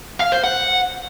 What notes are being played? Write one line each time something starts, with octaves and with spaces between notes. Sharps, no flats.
F5
C5
F#5